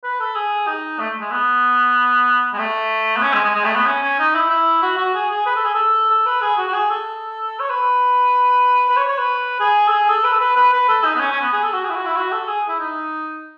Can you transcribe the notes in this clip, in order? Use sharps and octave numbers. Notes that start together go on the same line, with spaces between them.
B4
A4
G#4
D#4
A3
G#3
B3
G#3
A3
B3
C#4
G#3
G#3
G#3
A3
B3
C#4
C#4
D#4
E4
E4
F#4
F#4
G#4
G#4
B4
A4
G#4
A4
A4
B4
G#4
F#4
F#4
G#4
A4
C#5
B4
B4
C#5
C#5
B4
G#4
A4
G#4
A4
B4
A4
B4
B4
B4
A4
D#4
B3
C#4
C#4
B3
G#4
A4
F#4
G#4
E4
F#4
E4
F#4
A4
G#4
E4
D#4